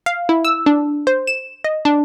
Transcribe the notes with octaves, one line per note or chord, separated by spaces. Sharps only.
F5
E4
E6
D4
C5
E7
D#5
D4